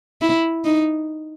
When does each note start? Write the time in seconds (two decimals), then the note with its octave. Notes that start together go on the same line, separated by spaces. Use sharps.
0.21 E4
0.65 D#4